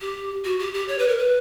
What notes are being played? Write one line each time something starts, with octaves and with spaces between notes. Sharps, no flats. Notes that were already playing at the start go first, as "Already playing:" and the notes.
G4
F#4
G4
G4
C#5
B4
A#4
B4